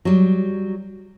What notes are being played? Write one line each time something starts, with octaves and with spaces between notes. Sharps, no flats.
F#3 G3